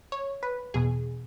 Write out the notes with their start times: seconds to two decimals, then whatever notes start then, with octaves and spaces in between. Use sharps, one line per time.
0.12 C#5
0.43 B4
0.74 E2 B2 G#4